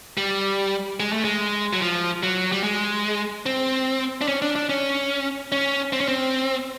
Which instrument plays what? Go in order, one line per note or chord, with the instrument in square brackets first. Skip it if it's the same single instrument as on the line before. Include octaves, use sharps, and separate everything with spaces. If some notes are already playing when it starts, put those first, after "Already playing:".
[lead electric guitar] G3
G#3
A3
G#3
F#3
F3
F#3
G3
G#3
C4
D4
C#4
D4
D4
C#4
C#4
C4
C#4
C4